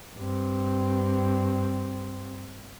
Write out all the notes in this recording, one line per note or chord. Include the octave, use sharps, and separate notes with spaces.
G2 C4